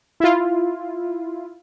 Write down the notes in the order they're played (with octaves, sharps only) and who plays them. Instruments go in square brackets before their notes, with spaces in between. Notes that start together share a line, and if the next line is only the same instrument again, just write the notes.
[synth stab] E4 F4